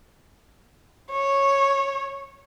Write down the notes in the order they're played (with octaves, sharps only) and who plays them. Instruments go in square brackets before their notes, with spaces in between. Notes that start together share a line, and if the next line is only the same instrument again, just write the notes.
[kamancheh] C#5